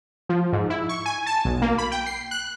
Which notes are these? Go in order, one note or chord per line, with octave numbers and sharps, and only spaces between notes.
F3
G#2
E4
C#6
G#5
A5
B1
A#3
B5
G5
C7
F#6